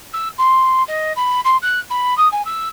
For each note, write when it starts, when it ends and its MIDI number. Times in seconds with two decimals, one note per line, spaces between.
0.13 0.28 88
0.38 0.83 84
0.87 1.12 75
1.16 1.40 83
1.44 1.56 84
1.62 1.79 90
1.90 2.16 83
2.17 2.28 87
2.32 2.42 80
2.45 2.68 88